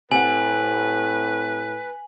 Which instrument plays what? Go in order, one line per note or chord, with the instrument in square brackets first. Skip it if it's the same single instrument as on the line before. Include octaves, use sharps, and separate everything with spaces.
[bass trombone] A2 [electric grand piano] C3 F#5 [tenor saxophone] B4 [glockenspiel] G#5 F#7